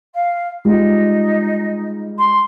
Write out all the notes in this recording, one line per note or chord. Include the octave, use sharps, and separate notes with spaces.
F5
G3 G#3 D#4 F4
C6